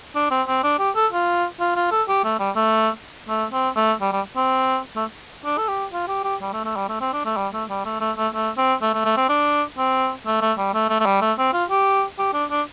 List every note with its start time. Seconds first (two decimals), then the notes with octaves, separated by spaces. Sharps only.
0.15 D4
0.31 C4
0.47 C4
0.63 D4
0.79 G4
0.96 A4
1.12 F4
1.60 F4
1.76 F4
1.91 A4
2.08 G4
2.24 A3
2.39 G3
2.56 A3
3.29 A3
3.53 C4
3.76 A3
4.01 G3
4.12 G3
4.36 C4
4.96 A3
5.45 D4
5.58 A4
5.68 G4
5.93 F4
6.08 G4
6.24 G4
6.41 G3
6.53 A3
6.65 A3
6.76 G3
6.89 A3
7.01 C4
7.13 D4
7.25 A3
7.37 G3
7.53 A3
7.69 G3
7.85 A3
8.01 A3
8.17 A3
8.33 A3
8.57 C4
8.82 A3
8.94 A3
9.05 A3
9.17 C4
9.29 D4
9.78 C4
10.26 A3
10.41 A3
10.58 G3
10.74 A3
10.89 A3
11.00 A3
11.06 G3
11.21 A3
11.38 C4
11.53 F4
11.70 G4
12.19 G4
12.33 D4
12.51 D4